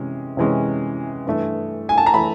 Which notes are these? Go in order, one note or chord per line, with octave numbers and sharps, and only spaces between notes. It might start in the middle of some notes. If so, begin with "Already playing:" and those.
Already playing: C3 E3 G#3 C#4
C3 E3 G#3 C#4
G2 E3 A3
G#5
A5
A#5
E3 A3 B5